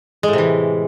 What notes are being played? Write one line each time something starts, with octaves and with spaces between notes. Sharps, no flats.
A2 C3 E3 G#3